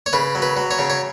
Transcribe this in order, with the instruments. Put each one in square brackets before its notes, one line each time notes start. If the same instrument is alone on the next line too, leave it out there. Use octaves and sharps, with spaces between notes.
[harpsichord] C#5
C#3 B4
F#3
B4
F#3
C#5
C#3
C#5